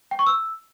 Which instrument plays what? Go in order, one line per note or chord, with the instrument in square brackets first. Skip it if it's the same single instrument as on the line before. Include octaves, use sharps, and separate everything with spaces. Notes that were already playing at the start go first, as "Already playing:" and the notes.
[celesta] G5
C#6
E6